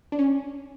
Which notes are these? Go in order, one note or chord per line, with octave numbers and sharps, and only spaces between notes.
D4
C#4